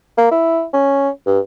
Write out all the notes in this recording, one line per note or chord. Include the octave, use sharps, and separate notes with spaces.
A#3
E4
C#4
G2